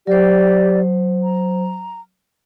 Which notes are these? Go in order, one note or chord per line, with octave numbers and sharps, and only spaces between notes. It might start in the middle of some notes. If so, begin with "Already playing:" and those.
F#3 G4 C5 D5
A#5